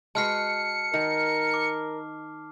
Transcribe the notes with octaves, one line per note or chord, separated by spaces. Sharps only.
G#3 F#4 B4 A5 F6 C7 C#7
D#3 A#4
D6